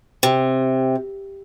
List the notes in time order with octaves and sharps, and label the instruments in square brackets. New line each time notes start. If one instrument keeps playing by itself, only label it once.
[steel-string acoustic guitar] C3